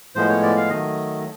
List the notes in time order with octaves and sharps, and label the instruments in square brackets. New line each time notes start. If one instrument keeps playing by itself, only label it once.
[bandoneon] A2 F3 G#3 B3 C5
C#5
D5
F5
D#3 F#3 A3 D#5